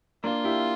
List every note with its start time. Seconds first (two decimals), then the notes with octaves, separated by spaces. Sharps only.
0.24 A#3 D4 F4
0.44 E4 G4